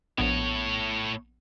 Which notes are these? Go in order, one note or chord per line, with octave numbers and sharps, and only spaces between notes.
A#1 A2 B3 C#5